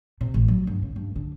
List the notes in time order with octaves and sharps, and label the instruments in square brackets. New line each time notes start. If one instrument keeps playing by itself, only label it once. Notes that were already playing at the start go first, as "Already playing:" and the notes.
[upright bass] C3
A1
F#3
G1
C#3
G2
D3